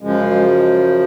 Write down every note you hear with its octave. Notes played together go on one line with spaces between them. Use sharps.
F#2 C#3 F3 G#3